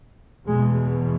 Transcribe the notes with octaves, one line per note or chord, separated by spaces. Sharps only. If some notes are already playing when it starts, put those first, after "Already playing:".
E2 B2 G#3